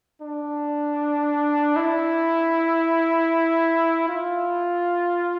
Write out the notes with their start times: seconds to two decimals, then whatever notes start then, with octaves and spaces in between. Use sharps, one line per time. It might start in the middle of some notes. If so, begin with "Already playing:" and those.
0.21 D4
1.76 E4
4.09 F4